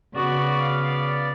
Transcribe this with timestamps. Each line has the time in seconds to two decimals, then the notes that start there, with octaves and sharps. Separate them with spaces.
0.15 C#3 B3 F#4 D5
0.59 F5